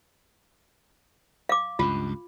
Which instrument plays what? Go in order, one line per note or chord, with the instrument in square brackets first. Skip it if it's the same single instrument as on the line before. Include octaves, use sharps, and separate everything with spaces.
[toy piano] F5 D6
[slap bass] C#2 G2 [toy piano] F4